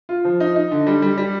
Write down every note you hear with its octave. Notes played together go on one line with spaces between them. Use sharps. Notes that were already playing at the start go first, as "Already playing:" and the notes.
F4
F3
D#4
D#4
D3
G3
G3
G3